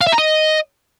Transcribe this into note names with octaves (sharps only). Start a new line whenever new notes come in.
F5
E5
A#5
D#5